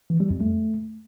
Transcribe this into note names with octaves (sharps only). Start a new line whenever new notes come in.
E3
G3
F2
A3